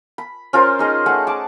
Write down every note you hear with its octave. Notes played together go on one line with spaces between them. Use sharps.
B5
C#4 F4 A#4 C5
D#4 G#4 D#5
A3 G#4 F#5
A5 D6